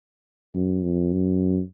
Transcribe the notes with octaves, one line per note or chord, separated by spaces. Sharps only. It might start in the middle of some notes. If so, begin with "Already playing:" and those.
F#2
F2
F#2